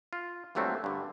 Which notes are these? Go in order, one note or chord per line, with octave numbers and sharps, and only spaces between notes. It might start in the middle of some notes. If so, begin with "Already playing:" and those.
F4
G2 A#2 F#3 A3 C4 C#4
G2 D3